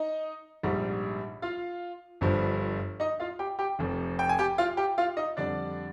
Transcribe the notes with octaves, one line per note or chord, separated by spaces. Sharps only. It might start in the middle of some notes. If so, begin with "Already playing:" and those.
Already playing: D#4 D#5
A#1 G#2 G3
F4 F5
G1 G2 F3
D#4 D#5
F4 F5
G4 G5
G4 G5
F1 F2 C3
G5
G#5
G4 G5
F4 F5
G4 G5
F4 F5
D#4 D#5
F2 D3 G3 D4 D5